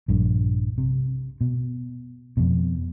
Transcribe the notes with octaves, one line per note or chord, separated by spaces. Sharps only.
A#1 G2
C3
B2
F2 B2